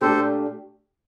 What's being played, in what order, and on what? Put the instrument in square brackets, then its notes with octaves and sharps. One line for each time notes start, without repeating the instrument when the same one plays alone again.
[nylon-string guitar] A#2 A3 D4 G4 [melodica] A4 C5